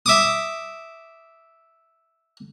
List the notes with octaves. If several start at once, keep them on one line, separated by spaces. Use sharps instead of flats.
E5 D6 D#6